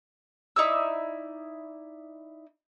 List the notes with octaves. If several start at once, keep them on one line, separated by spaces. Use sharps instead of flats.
D#4 E4 D5 E6